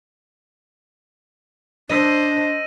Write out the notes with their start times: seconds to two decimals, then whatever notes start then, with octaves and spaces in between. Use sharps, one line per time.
1.90 D4 C5 D#5 E6 A#6 D#7